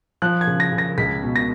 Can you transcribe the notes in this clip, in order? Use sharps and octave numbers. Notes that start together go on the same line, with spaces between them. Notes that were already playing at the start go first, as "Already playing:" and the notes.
F3 F#6
G#6
C#3
A#6
C#3
A#6
C#2 B6
B2
A#6